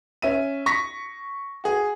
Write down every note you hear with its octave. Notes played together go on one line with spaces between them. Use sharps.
C#4 E5 D#7
C#6 A#6 B6
F#4 G#4